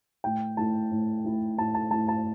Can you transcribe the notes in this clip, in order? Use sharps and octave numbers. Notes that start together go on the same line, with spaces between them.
A2 G5
A3 E4 A5
A2
A3 E4
A2 A5
A5
A3 E4 A5
A5